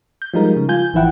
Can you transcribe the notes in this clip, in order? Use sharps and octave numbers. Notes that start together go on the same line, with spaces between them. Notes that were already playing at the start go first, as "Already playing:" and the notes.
G6
F3 G3 G#3 D#4 A#4
C#3
F4 G#5 G6
A1 E3 F3 E4 F#5 G5